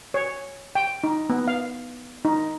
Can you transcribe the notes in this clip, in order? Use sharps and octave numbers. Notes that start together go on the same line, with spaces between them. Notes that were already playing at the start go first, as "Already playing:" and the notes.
C#5
G5
D#4
B3
F5
D#4